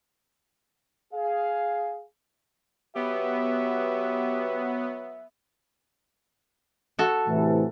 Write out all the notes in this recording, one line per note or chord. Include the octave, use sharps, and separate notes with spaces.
G#4 F5
F#3 B3 G4 E5
F#4 A4
A2 C3 E3